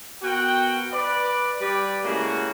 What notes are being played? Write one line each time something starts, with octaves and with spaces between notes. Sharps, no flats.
B3 F#4 A#4 F#5 G5
B4 D5
G3 G4 B4 D5
A2 C#3 G#3 A#3 F#4